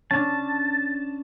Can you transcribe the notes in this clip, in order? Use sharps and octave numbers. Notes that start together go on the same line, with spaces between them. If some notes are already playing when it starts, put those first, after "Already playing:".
C#4 D4 A5